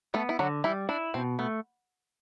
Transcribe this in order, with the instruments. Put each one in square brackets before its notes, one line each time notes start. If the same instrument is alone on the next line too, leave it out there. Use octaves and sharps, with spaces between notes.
[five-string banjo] A3 A4 [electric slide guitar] B3
[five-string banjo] E4
[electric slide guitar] D3 [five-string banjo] F#3 F#4
[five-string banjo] E3 E4 [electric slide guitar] G3
[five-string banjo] D4 [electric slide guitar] E4
[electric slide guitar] B2 [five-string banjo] C4
[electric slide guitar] A3 [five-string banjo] B3